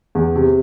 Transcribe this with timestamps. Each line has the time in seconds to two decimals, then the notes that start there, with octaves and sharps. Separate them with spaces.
0.15 E2
0.36 C3